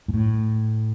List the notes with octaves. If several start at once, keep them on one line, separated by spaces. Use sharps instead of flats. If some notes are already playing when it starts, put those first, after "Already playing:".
G#2
A2